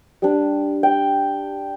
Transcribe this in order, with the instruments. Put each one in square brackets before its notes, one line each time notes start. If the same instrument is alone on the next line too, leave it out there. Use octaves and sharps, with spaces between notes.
[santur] G3 D4
G5